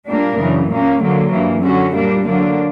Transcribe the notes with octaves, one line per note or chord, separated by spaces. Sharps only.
A#2 G3 A#3 D4 A#4
F#2 C#3 E3
A#2 A#3 C#4
D3 F#3 A#3
G2 E3 A#3
F#2 D3 F#3 C#4 F#4
A#2 G3 A#3 D4
D3 F#3 A#3 D4